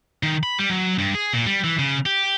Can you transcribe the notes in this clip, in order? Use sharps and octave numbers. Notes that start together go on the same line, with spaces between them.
D#3
B5
G3
F#3
G2
G#4
A#2
G3
E3
C#3
G4